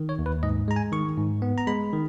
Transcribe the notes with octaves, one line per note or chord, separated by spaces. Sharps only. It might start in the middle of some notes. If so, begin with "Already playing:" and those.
Already playing: D#3
C#5
D#2
B4
G#2 D#5
G#3 A#5
G#5
D#3 C#6
G#2
B3
A#5
G#3 B5
D#3